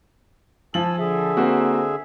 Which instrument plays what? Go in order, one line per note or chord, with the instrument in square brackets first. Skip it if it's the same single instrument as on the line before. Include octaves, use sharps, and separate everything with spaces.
[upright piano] F3 F#7 [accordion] G#5 A5 E6
[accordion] D3 G#4 E5
[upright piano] A#3 C4 F#4